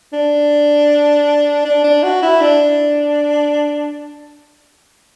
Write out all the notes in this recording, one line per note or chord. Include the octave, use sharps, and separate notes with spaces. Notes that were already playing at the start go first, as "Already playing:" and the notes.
D4
D4
D4
F#4
E4
D4